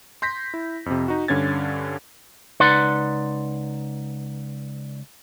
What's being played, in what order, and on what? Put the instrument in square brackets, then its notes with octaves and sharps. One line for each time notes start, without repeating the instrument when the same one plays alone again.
[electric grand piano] C6 G6 A#6 B6
E4
F2 C3
D#4 F#4
G2 D3 C#4 G#6 A6
[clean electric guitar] C#2 D#4 B4 D5 F#5 C6